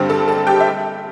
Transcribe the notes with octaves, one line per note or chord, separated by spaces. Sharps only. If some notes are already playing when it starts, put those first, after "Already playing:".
Already playing: G2 D3 G3 C4
A4 A5
A4 A5
G4 G5
E5